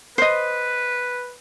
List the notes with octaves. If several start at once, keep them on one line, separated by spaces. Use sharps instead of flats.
B4 C5 D#5